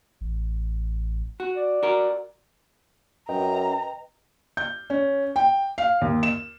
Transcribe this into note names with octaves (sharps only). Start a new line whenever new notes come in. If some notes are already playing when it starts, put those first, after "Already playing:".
A1
F#4
D5
F#4 A#4
F#2 B4 D#5 G5 A#5
G6
C#4
G5
F5
D#2
E7